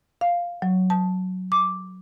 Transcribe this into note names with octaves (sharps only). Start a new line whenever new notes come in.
F5
F#3
A5
D6